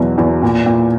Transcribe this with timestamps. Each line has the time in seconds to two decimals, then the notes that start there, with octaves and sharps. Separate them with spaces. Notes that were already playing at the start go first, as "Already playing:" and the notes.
Already playing: E2 B2 F#3
0.18 E2
0.42 A#2
0.66 A#2